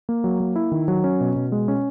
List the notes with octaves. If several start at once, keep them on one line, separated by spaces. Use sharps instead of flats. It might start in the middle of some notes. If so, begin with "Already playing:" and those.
A#3
F#3
A#3
E4
D#3
F#3
C#4
B2
B2
G#3
C#4